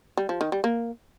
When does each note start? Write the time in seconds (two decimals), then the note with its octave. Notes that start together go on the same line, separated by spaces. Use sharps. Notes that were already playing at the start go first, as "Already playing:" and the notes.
0.17 G3
0.29 F3
0.41 D#3
0.52 G3
0.64 A#3